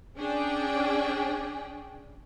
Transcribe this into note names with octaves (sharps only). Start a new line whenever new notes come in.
C#4 D4 G#4 G5